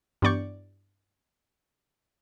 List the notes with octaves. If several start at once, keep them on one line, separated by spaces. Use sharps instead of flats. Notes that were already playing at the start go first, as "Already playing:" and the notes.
G2 E3 B3 D5 C#6 G6